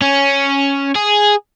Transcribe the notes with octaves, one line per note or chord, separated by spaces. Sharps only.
C#4
G#4